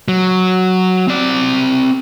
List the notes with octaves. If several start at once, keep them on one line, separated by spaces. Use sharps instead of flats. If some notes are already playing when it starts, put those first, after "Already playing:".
F#3
C4 D5